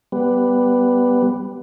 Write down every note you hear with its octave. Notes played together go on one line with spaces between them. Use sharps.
G3 B3